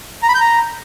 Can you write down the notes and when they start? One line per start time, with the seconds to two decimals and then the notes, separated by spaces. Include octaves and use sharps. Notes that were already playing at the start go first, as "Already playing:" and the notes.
0.23 A#5
0.29 B5
0.35 G6
0.41 A#5